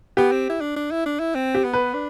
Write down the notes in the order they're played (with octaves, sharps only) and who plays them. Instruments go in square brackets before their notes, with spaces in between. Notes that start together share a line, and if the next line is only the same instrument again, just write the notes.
[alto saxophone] B3 [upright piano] G4
[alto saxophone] C4
E4
D4
D4
E4
D4
E4
C4
[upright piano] G4
[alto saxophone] B3
[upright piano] B4
[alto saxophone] D4